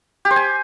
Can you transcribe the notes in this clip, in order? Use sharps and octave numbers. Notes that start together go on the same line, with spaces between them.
G4
C5
G#5